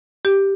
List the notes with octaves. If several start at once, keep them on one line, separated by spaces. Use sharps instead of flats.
G4